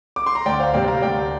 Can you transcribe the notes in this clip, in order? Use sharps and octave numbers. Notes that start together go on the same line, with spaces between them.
D6
C6
A#5
D2 D5 G5
C5 F5
C3 G3 A#3 D5 G5
F5 A#5
D2 D5 G5